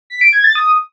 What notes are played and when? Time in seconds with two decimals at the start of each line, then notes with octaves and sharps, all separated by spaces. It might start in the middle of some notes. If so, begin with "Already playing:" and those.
0.10 B6
0.21 D7
0.33 G#6
0.44 A6
0.55 D#6